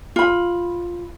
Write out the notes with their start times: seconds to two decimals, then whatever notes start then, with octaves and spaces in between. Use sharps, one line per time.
0.16 F4 B5